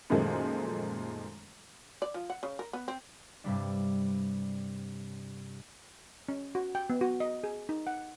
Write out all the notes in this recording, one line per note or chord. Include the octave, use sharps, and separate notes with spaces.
F#2 A#2 D#3 F3 G#3 A3
D5
F3
F#5
C#3
A#4
B3
C4
G2 C3 G3 D4
C#4
F#4
G5
B3
F#4
D#5
G#4
D#4
F#5